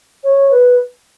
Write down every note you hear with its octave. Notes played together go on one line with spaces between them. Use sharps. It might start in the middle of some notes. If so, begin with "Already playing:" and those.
C#5
B4